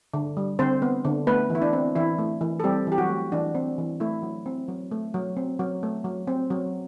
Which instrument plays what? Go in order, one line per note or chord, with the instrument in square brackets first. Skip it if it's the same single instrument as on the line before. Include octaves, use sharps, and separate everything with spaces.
[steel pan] D3
G3
D3 C4 C5
B3
D3
A3 B3 B4
E3
E4
D4
C4
E3 E4
A3
E3
A4
G3 C4 G4
E3 G4
F#3 F#4
A3
E3 D4
C4
E3
A3 E4
F#3
C4
F#3
A3
F#3
C4
F#3
A3
F#3
C4
F#3